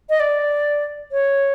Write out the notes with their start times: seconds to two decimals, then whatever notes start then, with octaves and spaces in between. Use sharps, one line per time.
0.10 D#5
0.20 D5
1.12 C#5